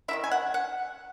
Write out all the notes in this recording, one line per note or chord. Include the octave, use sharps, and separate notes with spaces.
D#3 A#3 E4 E5
G#5
F#5
F#5